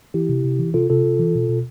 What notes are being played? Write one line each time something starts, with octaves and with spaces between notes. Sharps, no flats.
E3 E4 G4
C3
C3
E3
C3 F4 A4
C3 F4 A4
C3
E3
B2
B2